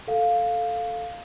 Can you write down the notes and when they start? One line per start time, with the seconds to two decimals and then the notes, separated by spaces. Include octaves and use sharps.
0.07 A4 F5